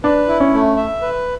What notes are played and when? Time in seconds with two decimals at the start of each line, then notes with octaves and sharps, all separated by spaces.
0.04 D4 B4
0.28 E4
0.40 C#4
0.53 A3
0.76 E5
1.02 B4